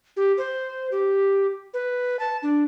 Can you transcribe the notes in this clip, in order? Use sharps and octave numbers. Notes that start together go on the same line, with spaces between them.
G4
C5
G4
B4
A5
D4